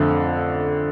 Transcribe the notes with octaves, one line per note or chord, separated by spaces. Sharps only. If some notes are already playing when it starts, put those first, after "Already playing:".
Already playing: F2 D3 A3